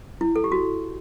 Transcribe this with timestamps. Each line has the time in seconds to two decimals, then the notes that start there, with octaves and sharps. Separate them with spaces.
0.21 E4
0.36 A4
0.44 G4
0.52 F#4